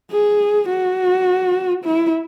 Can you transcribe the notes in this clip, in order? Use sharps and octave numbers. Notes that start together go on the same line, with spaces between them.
G#4
F#4
E4